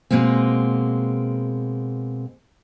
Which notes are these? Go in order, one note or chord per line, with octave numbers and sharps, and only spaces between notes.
B2 G#3 A#3 C4